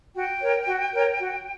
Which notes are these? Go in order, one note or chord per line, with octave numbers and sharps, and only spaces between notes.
F#4 G5
A#4 C#5
F#4
A#4 C#5
F#4